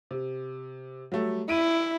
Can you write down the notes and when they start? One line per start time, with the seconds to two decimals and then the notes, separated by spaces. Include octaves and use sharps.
0.11 C3
1.12 F#3 G3 A3
1.49 E4 D7 D#7